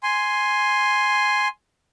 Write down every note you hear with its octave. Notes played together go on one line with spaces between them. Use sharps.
G#5 C6